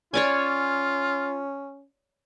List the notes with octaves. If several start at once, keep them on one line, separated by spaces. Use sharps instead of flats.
C#4 F4 C#5 D5 G#5